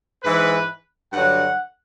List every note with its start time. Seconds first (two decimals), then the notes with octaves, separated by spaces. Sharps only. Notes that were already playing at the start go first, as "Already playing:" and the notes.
0.23 G#2 E3 B4
1.12 G2 D3 F#3 F#5